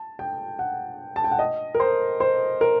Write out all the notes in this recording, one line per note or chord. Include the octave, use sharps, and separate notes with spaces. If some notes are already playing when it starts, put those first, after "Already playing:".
Already playing: A5
G5
F#5
A5
G5
F#5
D#5
A#4
C5
C5
A#4